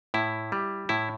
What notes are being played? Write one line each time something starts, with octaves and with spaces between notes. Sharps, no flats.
A2 E4
G3
A2 E4